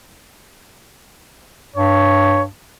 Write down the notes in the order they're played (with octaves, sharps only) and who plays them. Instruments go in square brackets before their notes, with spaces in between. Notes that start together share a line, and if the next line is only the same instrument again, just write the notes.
[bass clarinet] G2 [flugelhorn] C#5